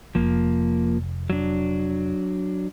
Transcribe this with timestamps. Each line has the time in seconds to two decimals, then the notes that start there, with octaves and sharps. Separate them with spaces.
0.15 F1 F3 A#3
1.30 F#3 D4